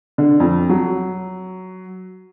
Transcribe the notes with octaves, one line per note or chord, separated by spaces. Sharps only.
D3
F2
F#3